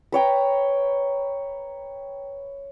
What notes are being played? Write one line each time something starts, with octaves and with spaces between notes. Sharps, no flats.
B4 C#5 G5 A#5